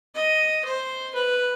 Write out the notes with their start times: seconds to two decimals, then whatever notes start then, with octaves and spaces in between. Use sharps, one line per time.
0.15 D#5
0.65 C5
1.14 B4